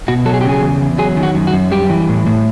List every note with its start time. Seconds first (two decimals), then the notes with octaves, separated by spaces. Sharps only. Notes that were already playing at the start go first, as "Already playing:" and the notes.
0.08 B2 F#4
0.25 F#3 A4
0.34 G#4
0.41 G4
0.45 C#3 G#4
0.62 E2
0.81 E2
0.98 F#3 G#4
1.17 D#3
1.23 F#4
1.35 F#2
1.47 F#4
1.53 F#2
1.71 G3 G4
1.90 E3
2.08 A2
2.26 A2